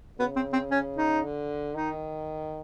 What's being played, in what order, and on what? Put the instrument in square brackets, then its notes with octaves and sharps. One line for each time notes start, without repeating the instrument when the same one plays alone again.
[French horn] C#3 [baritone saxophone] B3
[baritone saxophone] C4
C4
C#4
D#4
[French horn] D3
[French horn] D#3 [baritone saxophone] D#4